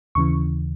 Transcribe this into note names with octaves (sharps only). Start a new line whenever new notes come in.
D#2 C#3 E3 C#6